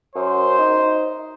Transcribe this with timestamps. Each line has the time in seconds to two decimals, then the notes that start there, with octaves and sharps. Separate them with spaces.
0.15 F#2 C5
0.58 D#4